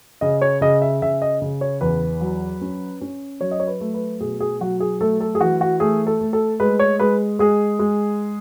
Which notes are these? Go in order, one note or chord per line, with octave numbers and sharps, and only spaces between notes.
C#3 D#5
C#5
C#3 D#5
E5
C#3 E5
D#5
C#3
C#5
E2 B4
F#3
C#4
C#4
F#3 C#5
D#5
C#5
B4
A3
B4
B2 G#4
G#4
F#3 F#4
G#4
A3 A4
A4
G#4
E3 F#4
F#4
A3 G#4
A4
A3
A4
G#3 B4
C#5
G#3 B4
G#3 G#4
G#3